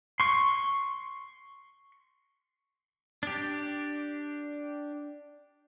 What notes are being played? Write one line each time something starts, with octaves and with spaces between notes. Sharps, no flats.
C6 C#6
D4 G4